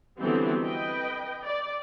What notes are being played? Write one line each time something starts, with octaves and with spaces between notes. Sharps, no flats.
D3 E3 F#3 G3 B3 C4
B4 D#5 G5
D5